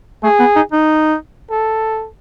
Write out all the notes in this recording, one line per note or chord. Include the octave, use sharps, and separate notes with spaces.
A3 G#4
B3
D#4
D#4
A4